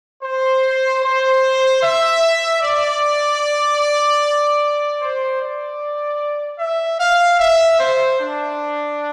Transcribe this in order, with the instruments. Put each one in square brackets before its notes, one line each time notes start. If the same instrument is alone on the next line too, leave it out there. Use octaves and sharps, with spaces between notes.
[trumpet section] C5
C5
E5
D5
C5
D5
E5
F5
E5
C5
D4